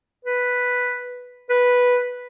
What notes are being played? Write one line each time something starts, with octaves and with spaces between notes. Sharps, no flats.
B4
B4